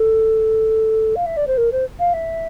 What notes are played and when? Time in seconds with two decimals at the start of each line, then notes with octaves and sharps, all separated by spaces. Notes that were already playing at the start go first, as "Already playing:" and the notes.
Already playing: A4
1.15 F5
1.26 E5
1.37 D5
1.47 C5
1.57 A#4
1.72 C5
1.99 F5
2.13 E5